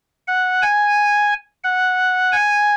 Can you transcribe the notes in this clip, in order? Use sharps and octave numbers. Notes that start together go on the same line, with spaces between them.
F#5
G#5
F#5
G#5